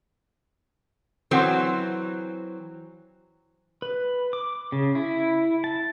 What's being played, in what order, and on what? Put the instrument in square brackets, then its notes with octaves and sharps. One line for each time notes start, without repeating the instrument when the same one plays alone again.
[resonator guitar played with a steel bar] E3 F#3 C4 [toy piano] A4 F#5 C6
[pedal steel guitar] B4
D6
C#3
E4
A5